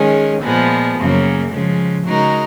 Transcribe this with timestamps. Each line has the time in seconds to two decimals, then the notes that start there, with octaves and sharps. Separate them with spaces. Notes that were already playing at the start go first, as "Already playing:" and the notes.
Already playing: D#3 G#3 C#4 G#4
0.44 A#2 F3 G#3 B3
0.98 F#2 C#3 F#3 A#3
1.52 C#3 F3 G#3
2.06 C#3 G#3 D#4 F#4 A#4